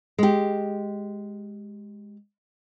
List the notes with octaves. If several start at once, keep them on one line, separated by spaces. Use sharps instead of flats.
G#3 G4